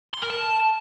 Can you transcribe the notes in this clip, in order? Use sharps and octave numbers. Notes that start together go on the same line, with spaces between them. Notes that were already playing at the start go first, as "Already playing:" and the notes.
C6
A#4
A5